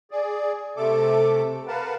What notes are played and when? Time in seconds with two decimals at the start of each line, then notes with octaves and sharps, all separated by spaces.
0.11 G#4 D5
0.77 C3 A3 A4 D6
1.68 A#4 B4 F5 F#5 A5